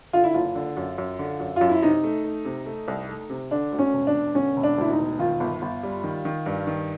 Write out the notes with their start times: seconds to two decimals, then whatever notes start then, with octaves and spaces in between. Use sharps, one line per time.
0.13 D3 F4
0.24 E4
0.34 F#1 F4
0.55 D3
0.77 F#2
0.98 F#2
1.19 D3
1.40 F#2
1.56 F#2 F4
1.69 E4
1.82 C3 D#4
2.04 A3
2.24 A3
2.45 C3
2.66 A3
2.88 C2
3.09 A3
3.30 C3
3.51 D3 D4
3.72 D2
3.79 C#4
3.93 E1
4.07 D4
4.14 E1
4.35 D3 C#4
4.56 E1
4.63 D4
4.78 D2 E4
4.91 D#4
4.98 E1
5.19 D#3 F4
5.40 G1
5.62 G1
5.83 G3
6.04 D#3
6.25 D#3
6.46 G2
6.67 D#3